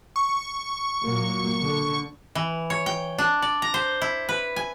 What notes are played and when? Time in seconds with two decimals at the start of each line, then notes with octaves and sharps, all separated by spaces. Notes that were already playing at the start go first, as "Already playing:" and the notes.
0.16 C#6
1.03 A#2 F#3 A#3
1.61 D3
2.35 E3
2.70 C#5
2.86 G5
3.18 D4
3.42 D5
3.62 A#5
3.74 C5
4.02 E4
4.29 B4
4.56 G#5